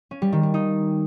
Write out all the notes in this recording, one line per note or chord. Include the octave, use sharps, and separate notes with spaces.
C#4
G3
D#3
G3
D#4